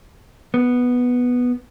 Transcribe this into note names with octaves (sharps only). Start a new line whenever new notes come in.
B3